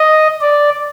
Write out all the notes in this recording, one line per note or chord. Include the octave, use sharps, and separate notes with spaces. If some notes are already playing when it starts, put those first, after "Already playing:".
Already playing: D#5
D5